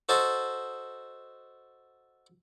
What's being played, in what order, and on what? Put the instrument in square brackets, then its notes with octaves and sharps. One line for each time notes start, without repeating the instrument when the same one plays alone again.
[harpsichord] F#4 A4 C5 D#5 A5